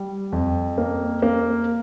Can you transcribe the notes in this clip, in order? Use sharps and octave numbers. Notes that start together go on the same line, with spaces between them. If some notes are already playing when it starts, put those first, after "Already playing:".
Already playing: G3
F2
A#3
A#3